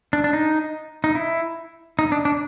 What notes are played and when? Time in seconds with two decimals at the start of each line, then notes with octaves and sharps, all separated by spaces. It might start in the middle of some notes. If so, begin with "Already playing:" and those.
0.13 D4
0.24 D4
0.33 D#4
1.04 D#4
1.15 E4
1.99 D#4
2.12 D4
2.25 D4